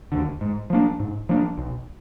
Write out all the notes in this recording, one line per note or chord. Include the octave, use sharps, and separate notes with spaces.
D#2 D3
G#2
F3 A#3 D4
G#2
F3 A#3 D4
B1